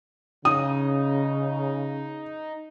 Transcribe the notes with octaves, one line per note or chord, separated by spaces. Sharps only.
C#3 D#4 D#6